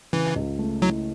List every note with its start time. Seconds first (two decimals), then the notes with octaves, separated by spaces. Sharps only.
0.13 C#3 E3
0.36 C#2
0.59 A3
0.82 F#3 E4